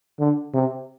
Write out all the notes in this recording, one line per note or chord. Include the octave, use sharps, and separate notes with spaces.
D3
C3